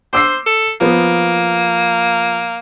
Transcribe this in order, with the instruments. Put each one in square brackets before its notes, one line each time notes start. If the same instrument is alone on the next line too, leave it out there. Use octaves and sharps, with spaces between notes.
[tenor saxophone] C5 [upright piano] D6 E6 C7
[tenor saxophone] A4
[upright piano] F3 B3 [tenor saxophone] A#3